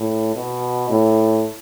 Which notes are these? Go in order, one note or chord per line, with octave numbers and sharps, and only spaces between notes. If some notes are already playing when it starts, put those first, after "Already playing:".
Already playing: A2
B2
A2